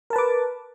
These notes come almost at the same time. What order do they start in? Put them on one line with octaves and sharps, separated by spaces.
A#4 A5 B4 D6